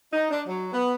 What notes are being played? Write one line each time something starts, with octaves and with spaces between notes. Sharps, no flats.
D#4
D4
F#3
B3